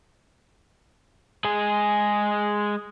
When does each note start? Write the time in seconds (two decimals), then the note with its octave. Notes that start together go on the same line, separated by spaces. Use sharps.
1.45 G#3 G#4